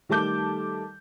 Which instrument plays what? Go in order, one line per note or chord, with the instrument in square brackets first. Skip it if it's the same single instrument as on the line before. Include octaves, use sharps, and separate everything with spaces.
[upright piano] D#3 G3 A3 A5 D6 G6